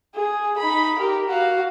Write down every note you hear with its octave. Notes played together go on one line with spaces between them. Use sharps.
G#4
D#4 B5
G4 A#4
F#4 F5